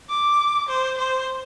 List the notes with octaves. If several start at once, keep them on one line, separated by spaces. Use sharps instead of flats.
D6
C5
C5